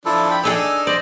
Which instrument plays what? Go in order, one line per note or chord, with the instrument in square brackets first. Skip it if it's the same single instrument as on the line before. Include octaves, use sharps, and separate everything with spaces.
[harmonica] F3 D4 [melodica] E4 A4
[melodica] G5 B5
[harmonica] D4 D#4 E6 [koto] G#4 A4 C#5 [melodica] G#5
[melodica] C5 D#5 [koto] D5